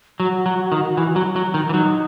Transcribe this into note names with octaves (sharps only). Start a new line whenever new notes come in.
F#3 F#4
F#3
D#3
E3
F#3
F#3
D#3
E3
F#3 D#4